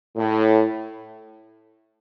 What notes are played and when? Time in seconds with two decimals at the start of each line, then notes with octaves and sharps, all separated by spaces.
0.16 A2